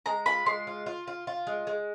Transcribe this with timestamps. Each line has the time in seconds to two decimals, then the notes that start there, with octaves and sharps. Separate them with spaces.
0.06 G#3 A#5
0.26 F4 B5
0.46 G#3 C6
0.67 F4
0.86 F4
1.07 F4
1.27 F4
1.47 G#3
1.67 G#3